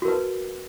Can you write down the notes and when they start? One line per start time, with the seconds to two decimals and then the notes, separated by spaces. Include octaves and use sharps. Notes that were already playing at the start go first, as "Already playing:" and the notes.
0.02 F#4
0.05 A#4
0.08 B4